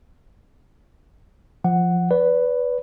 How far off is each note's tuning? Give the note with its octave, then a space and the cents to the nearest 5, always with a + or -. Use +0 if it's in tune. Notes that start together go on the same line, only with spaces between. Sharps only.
F3 +0 F#5 +0
B4 +5 D5 -30